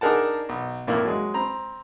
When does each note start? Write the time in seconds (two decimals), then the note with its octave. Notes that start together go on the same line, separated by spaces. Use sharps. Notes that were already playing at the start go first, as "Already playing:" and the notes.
0.01 D4 D#4 G#4 A#4 F#5 A5
0.49 B1
0.87 F2 A2 A#3 D4 E4
1.05 F#3 G#3
1.34 C4 A#5 B5